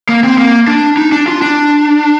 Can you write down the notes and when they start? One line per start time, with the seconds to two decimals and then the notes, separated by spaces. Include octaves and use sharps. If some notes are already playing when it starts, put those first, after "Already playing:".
0.09 A#3
0.24 C4
0.38 A#3
0.68 D4
0.97 D#4
1.12 D4
1.28 F4
1.42 D4